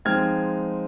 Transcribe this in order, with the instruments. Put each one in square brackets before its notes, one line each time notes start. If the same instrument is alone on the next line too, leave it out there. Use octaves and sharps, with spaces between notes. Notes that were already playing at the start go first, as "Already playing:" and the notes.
[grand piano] F3 G#3 C4 D#4 F6 G#6